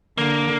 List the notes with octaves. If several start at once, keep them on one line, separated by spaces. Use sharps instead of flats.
D3 A#3